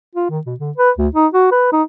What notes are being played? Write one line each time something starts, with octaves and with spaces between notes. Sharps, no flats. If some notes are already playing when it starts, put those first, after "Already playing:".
F4
D#3
B2
D3
B4
D2
D#4
F#4
B4
D#4